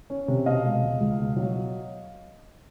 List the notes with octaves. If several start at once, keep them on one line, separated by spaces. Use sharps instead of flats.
C#4
C3
B2 D#5 F5
G#3
C#2
C#2
B2
F#3